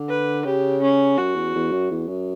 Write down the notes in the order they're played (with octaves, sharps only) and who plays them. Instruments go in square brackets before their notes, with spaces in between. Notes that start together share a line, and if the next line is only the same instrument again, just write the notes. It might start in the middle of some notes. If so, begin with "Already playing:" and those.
Already playing: [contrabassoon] D3
[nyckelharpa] B4
[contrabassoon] C#3 [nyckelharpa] G4
[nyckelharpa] C#4
[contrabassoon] F#2 [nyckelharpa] F#4
[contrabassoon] E2
E2
F#2
E2
F#2